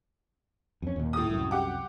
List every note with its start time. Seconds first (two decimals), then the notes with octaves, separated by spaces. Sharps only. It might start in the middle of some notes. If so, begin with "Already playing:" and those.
0.82 F2 C#4
0.96 D#2 A#2
1.13 A2 D#6
1.30 C2 F#2
1.51 G4 F#5 D6